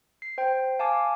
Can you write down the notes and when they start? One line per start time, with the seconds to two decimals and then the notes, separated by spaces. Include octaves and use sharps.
0.22 C7
0.38 C5 G5
0.79 F5 G#5 A5 D6